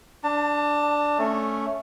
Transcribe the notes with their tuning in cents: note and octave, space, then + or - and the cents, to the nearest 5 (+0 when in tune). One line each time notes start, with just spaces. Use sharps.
D4 +0 A5 +30
A3 +0 C#4 +0